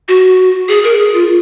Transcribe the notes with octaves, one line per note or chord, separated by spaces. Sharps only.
F#4
G#4
A#4
G#4
F4